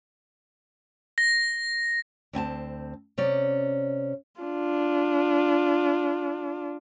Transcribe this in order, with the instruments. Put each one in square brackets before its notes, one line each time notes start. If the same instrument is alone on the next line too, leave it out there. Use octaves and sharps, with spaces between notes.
[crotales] A#6
[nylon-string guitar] D2 C4 G#5 A5
C3 C#4 D5
[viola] D4 F4